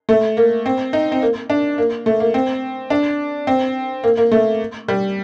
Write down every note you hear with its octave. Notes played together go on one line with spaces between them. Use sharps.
A3
A#3
C4
D#4
C4
A#3
D4
A#3
A3
A#3
C4
D4
C4
A#3
A#3
A3
G3